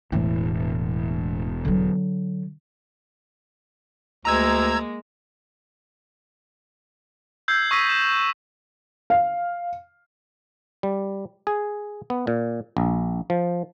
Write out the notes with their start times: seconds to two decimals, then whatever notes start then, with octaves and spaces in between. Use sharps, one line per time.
0.12 E1 A2 E3
1.65 D3 F#3
4.25 D2 G#3 A#3 A#5 E6 G#6
7.48 E6 G6 G#6 C7
7.71 C#6 D#6 E6 A#6 B6 D#7
7.89 E7
9.10 F5
10.83 G3
11.47 G#4
12.10 B3
12.27 A#2
12.77 A#1
13.30 F3